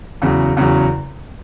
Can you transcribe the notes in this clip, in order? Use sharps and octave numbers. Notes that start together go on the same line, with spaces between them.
E2 C#3 F#3
E2 C#3 F#3